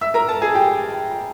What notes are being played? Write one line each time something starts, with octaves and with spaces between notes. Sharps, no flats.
E5 E6
A#4 A#5
A4 A5
G#4 G#5
G4 G5